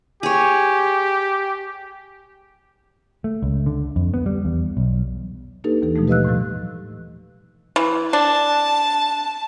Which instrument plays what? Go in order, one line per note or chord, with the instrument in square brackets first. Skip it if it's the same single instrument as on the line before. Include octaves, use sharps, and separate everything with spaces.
[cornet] G4 [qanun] G#4 C#5
[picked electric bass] A3
C#2
D3
F2
B3
G3
E2
B1
[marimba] A#3 D4 D#4 G4 A4 B4
D#2 E3 A4
B2 F3 G#3 A3
G4 B4 D#5 F5 E6 F#6
A2 E3 F#3
[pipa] E3
[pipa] D4 [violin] A5